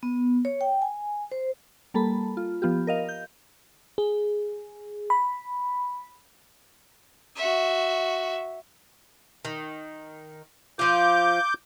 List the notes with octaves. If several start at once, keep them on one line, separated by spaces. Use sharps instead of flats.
B3
C#5
G5
G#5
C5
G3 A#3 A4 A5 B5
F4
F3 B3 F4 G4
A#4 D#5 F5
G6
G#4
B5
F#4 E5
D#3
F3 F4 D6 G6